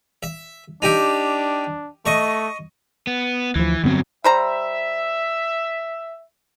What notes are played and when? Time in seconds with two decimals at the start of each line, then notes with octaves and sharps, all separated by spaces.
0.23 E5
0.82 D4 D#4 G4 E5
2.06 A3 D#5 C#6
3.07 B3
3.56 D2 E3 F3
3.84 G2 D3 F#3 B3 C4
4.24 G3 C5 E5 A#5